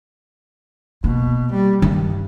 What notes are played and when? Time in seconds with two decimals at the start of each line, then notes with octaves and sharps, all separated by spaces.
1.04 B2 A#3
1.52 G3
1.82 G2 D#3